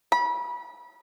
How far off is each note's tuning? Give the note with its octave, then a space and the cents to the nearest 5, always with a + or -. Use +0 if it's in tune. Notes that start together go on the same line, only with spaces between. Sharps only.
B5 -30